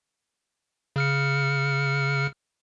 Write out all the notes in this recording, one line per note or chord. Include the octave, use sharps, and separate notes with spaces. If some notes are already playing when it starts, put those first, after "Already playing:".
C#3 F6 C#7